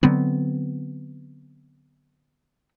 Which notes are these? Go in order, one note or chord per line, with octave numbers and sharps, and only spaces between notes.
D3 F#3 B3 C4